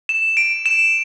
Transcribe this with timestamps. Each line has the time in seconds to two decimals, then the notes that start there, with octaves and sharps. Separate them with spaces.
0.09 E7
0.37 D7
0.66 E7